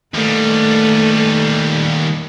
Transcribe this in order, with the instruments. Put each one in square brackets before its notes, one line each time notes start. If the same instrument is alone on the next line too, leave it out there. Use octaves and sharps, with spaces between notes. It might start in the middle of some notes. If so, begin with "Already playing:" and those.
[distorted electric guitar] D#2 G3 [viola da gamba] A3 A4 B4